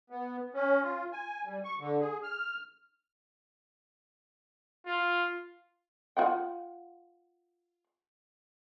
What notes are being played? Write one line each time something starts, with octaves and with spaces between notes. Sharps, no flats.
B3
C#4
F4
G#5
G3
C#6
D3
G#4
F6
F4
F4 F#5 G5